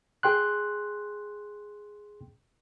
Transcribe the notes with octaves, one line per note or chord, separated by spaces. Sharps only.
G#4 G5 C6 F#6